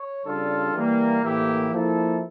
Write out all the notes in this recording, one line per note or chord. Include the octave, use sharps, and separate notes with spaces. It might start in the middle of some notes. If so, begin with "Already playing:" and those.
Already playing: C#5
C#3 G3 D4 F4 A4
E3 G3 A#3
A2 E3 A#3 E4 G4
F3 A#3 E4 A4